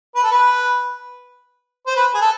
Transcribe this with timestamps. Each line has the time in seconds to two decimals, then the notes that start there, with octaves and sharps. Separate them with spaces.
0.15 B4
0.23 A4
0.31 B4
1.87 C5
1.96 B4
2.14 G#4
2.21 A4